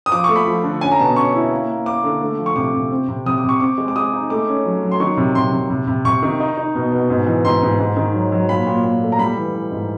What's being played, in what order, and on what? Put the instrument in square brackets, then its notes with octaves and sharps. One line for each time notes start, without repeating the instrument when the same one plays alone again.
[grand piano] D#6
F3 D6
C#6
A3
B5
F3
D3
C#4 G#5
A#5
B2 A5
C#4 C#6
E4
A#3
A#3
A#3 D6
D3
A3
F3
C#6
C3 D6
C3
C4
C3
C3 D#6
D6
C3
C#6
C4 D6
G#3
D6
G#3 D#6
D#4
A3 D6
C#4
F#3
F#3
C6
D#3 C#6
C3
C3 C6
C3
C3
C3
C3 C#6
D#3
D#4
D#4
B2
B2
G#2
E3
G#2 C6
G#2
G#2
D#3
F#3
F#3
A#2 B5
A#2
A#2
A3
A#5
G3 B5
E3
E3
G#2